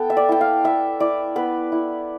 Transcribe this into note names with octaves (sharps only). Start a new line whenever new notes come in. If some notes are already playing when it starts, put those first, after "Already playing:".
Already playing: B3 A4 G5 A5
E5
D5
E4 G5
F5
E4 E5
E4 D5
B3 B4
E4